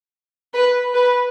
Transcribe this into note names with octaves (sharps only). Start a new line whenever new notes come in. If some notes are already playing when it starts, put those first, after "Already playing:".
B4
B4